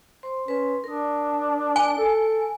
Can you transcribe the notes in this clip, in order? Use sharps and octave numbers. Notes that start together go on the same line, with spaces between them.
C5 C6
C#4 B4 C6
D4 A#4 D#6
G#5
A4